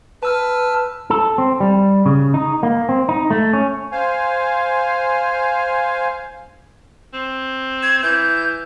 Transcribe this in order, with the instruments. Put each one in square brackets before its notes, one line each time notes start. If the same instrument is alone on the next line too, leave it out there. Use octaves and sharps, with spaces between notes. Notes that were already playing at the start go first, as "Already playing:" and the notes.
[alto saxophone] B4 [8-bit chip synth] A5 E6 F6
[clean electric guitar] A4
C4
G3
C#3
D#4
A#3
C4
D#4
A3
C#4
[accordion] C5 F5 G#5
[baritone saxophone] C4
[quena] G#6
[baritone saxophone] E3 [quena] G6